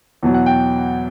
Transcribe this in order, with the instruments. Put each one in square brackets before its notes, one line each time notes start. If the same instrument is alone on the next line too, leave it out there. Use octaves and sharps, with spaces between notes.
[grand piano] E2 B2 F#3
F#5
G5